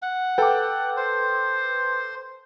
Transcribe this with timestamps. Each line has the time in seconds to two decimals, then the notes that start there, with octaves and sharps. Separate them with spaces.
0.02 F#5
0.38 A4 B4 G5 A5 D6
0.97 C5